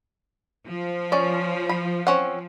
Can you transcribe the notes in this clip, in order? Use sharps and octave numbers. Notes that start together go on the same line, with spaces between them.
F3
C#4 D5
B5
C4 C#4 F#5